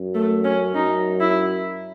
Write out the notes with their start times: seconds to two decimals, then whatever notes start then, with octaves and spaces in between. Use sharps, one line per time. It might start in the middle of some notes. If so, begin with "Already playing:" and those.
Already playing: F#2
0.15 A3
0.44 C#4
0.75 F#2 D#4
1.20 E4